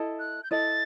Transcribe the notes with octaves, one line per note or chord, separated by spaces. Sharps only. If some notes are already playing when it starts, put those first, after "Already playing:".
Already playing: E4 A4 D#5
F#6
G6
E4 A4 D#5 A6